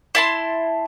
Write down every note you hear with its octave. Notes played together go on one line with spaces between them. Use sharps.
E4 A5 C6